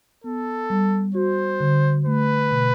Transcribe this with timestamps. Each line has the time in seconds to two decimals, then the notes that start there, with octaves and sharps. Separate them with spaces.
0.24 B3 A4
0.70 G3
1.14 F#4 C5
1.60 D3
2.05 A3 B4
2.51 B2